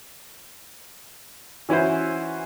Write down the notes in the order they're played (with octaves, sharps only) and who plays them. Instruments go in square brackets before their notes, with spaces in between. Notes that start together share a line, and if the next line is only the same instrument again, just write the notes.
[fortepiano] E3 C#4 E4 F#4 C5